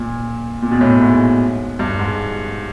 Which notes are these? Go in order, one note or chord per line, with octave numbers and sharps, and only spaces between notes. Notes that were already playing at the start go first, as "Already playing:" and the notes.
Already playing: A#2
A#2
B2
A2
G#2
G2
G#2